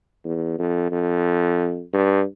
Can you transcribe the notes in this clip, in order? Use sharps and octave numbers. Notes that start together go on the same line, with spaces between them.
E2
F2
F2
G2